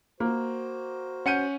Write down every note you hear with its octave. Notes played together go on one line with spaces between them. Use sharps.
A#3 F#4 C5
C#4 F#5 G6 C#7 D#7